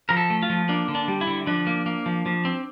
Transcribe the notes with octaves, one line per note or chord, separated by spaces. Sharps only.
F3 A#4
A4
A3
F4
F3
A#3 D4
D3
D4
G3
E4
D3
F3 D4
A#3
A#3
F3
F3
C4